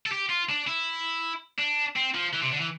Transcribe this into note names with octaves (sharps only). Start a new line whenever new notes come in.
A4
G4
F4
D4
E4
D4
C4
F3
E3
C3
D3
E3